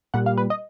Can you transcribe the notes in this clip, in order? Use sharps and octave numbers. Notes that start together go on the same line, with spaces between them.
A#2 G3 F#5
F5
B4
D#5